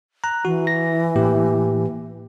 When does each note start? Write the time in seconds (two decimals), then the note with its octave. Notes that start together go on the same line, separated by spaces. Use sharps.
0.24 A#5 F#6
0.45 E3 F#4
0.67 A#6
1.16 A2 A#3 G4